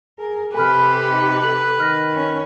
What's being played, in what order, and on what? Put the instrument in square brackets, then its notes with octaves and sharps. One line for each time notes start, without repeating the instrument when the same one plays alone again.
[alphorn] G#4 [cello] A#4
[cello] C3 G4 [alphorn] A4 [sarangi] B4 [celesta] G#5 B5 F6
[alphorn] D#4
[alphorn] A4 [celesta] F#7
[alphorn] D#3 [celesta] F6 A#6
[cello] C#4